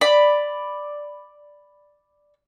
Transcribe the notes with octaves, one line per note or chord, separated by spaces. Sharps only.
D5 B5